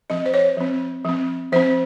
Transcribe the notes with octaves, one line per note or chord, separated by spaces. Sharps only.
F3 C4 D#5
C5
C#5
F3 C4
F3 C4
F3 C4 C5